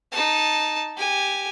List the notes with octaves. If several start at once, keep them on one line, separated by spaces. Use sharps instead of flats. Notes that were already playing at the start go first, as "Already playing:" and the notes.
D#4 A5
G4 G#5